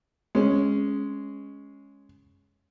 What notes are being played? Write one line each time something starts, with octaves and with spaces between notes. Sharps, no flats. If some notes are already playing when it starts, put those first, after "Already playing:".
G#3 C#4